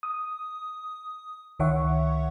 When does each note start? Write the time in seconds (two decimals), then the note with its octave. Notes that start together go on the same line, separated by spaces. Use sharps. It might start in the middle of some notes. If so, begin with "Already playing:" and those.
0.03 D#6
1.59 C#2 D#3 C#5 E5 F#5 C#6